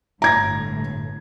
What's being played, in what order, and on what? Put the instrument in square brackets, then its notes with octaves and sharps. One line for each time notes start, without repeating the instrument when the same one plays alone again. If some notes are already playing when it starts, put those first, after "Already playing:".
[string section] G1 A2 [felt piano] A#5 G#6 A#6